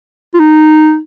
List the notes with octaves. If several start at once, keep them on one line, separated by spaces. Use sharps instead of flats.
F4
D#4